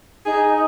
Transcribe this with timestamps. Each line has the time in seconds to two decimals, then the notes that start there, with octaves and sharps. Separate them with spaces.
0.25 D#4 G#4